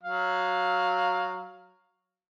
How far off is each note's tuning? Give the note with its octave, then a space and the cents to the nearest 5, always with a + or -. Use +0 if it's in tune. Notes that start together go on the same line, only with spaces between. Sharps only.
F#3 +0 F5 +10